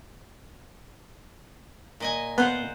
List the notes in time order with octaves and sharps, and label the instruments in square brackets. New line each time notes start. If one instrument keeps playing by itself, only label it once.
[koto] A#2 D#5 G#5
[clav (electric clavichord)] B3 [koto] F4 C5 F#5